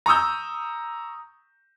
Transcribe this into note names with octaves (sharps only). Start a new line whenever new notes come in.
A#5 C#6 D#6 E6 G6